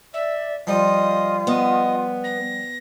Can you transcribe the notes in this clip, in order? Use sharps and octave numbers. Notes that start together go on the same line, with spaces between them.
D5 E5
F3 G3 F4 D#5
B3 D#5
A#6